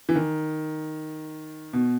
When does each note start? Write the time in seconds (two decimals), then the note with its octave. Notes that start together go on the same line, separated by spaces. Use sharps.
0.09 E3
0.15 D#3
1.73 B2